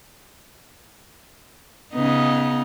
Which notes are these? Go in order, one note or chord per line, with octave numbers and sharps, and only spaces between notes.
C#3 B3 D#4